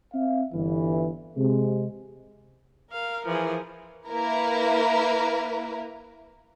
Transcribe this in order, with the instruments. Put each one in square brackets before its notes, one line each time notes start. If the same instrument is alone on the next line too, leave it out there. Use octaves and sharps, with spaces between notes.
[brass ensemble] C4 E5 F5
G1 E3
C3 G#3
[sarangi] A#4 [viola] F5
[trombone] E3 [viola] F3 G#4
[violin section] A#3 E4 A#4 B4